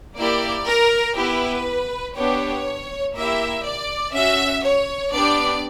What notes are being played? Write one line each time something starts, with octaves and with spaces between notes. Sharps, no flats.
A#3 E4 G4 D5
A#4
B3 E4 G4 B4
B3 D4 G4 C#5
A#3 E4 G4 E5
D5
C#4 F#4 E5
C#5
B3 D4 G4 D5